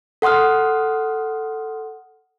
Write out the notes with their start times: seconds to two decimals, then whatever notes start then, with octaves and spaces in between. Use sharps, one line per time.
0.22 A4 F#5 C6 D#6 F6